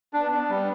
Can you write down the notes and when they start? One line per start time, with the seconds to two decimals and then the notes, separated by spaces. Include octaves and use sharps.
0.13 B3 D4
0.32 D4
0.50 G3